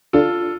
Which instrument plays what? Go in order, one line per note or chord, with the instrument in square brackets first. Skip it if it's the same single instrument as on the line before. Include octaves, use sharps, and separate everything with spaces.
[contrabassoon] D3 [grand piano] F4 A4